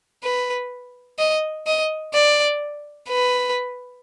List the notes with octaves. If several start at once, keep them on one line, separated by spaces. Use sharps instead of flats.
B4
D#5
D#5
D5
B4